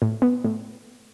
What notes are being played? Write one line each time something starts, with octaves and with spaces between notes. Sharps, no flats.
A2
B3
A2